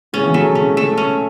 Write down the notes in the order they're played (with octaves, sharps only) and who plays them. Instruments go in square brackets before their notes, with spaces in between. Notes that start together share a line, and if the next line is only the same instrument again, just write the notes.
[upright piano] A2 C#3 [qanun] C#4
[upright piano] B2 E3
[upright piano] C#3 F#3 [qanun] A3
[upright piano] A2 C#3 [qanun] C#4
[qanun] A3
C#4